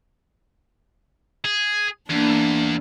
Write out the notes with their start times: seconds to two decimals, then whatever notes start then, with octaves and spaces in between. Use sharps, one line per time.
1.45 G#4
2.10 E2 A#3 D4